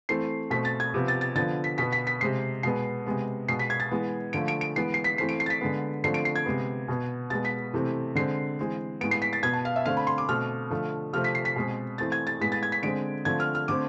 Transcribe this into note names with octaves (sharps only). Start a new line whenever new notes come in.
E3 A3 C4 C7
B2 A3 C4 B6
A6
G#6
C3 F3 B3
A6
A6
D3 F3 B3 A6
B6
B2 B3 B6
B6
B6
C3 G#3 C4 C7
B2 G#3 B3 C7
C3 G#3 B3
B2 G#3 B3 C7
B6
G#6
A6
E3 G#3 B3
D3 F3 A3 D7
D7
D7
E3 G#3 B3 C7
C7
B6
E3 A3 C4 C7
D7
C7
A6
B6
D3 G#3 B3
D3 F3 A3 C4 C7
D7
C7
G#6
C3 G#3 B3
B2 B3
B2 G#3 B3 A6
B6
C3 E3 A3 C4
D3 G#3 C4 C7
E3 G#3 C4
A2 G#3 B3 D7
C7
B6
A6
B2 B3 G#6
A5
F5
E5
D3 A3 C4 F5
B5
C6
D6
B2 A3 C4 F6
D3 F3 A3
C3 F3 A3 C4 F6
B6
C7
B6
B2 G#3 C4
E3 A3 C4 A6
G#6
A6
A2 G#3 B3 B6
A6
G#6
B6
D3 G#3 C4 D7
D3 F3 A3 C4 G#6
F6
F6
D3 A3 C4 D6